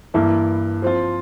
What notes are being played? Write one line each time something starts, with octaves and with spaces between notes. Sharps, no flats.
G2 E3 A#3 E4
F3 C4 F4